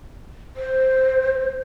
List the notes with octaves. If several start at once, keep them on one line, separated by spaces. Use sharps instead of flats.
C5